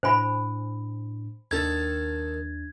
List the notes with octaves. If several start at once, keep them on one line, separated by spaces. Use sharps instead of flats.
A2 D4 C5 G#5 B5
D#2 D#3 D4 A4 G#6 A6